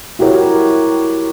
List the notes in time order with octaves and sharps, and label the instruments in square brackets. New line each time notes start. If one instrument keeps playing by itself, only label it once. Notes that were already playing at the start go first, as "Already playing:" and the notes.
[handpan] E4 F#4 G4 A#4 C#5